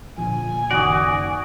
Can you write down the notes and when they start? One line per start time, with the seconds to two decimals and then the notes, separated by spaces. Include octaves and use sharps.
0.18 A#2 D3 F3 G#5
0.71 F#1 D#3 F#4 D5 D#6